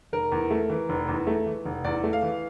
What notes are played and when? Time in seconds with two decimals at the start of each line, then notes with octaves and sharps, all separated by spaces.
0.13 F1 A#4
0.32 E2
0.51 A3
0.70 E3
0.89 F1
1.08 E2
1.27 A3
1.46 E3
1.65 F1
1.84 E2 D5
2.04 A3
2.13 F5
2.23 E3